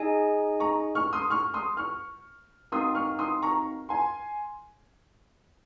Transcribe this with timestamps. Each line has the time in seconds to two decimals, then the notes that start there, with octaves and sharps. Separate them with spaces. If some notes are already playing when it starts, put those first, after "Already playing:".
Already playing: D#4 G#4 D#5 G#5
0.60 A#5 C#6
0.95 C#6 F6
1.13 C6 D#6
1.30 C#6 F6
1.54 C6 D#6
1.77 C#6 F6
2.72 C4 D#4 F#4 A#4 F5 C6 D#6
2.95 C#6 F6
3.19 C6 D#6
3.42 A#5 C#6
3.89 G#5 C6